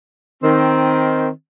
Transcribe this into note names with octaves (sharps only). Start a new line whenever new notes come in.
D#3 C4